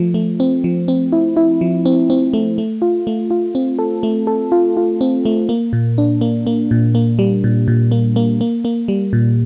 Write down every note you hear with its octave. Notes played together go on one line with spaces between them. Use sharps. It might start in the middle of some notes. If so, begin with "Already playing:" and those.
Already playing: F3 A3
A3
C4
F3
C4
E4
E4
F3
C4
C4
A3
A3
F4
A3
F4
C4
A4
A3
A4
F4
F4
C4
A3
A#3
A#2
D4
A#3
A#3
A#2
A#3
G3
A#2
A#2
A#3
A#3
A#3
A#3
G3
A#2